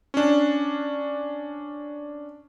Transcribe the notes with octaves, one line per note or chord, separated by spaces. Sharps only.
C#4 D4